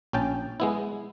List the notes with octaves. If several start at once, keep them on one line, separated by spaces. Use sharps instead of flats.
A#1 C#4 G5 A5
G#3 B3 E4